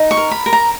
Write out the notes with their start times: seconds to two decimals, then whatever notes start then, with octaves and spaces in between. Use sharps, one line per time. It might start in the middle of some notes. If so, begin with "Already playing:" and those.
Already playing: D#4
0.11 C#6
0.17 A#4
0.31 B5
0.46 A#4
0.53 A#5